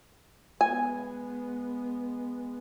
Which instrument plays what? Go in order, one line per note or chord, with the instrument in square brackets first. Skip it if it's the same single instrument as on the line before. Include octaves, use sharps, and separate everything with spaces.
[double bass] G#3 B3 [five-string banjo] G#5